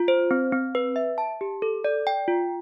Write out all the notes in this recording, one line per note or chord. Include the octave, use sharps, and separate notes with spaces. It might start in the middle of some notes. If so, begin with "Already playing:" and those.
Already playing: F4
C5
C4
C4
B4
E5
A5
G4
A4
D5
G5
F4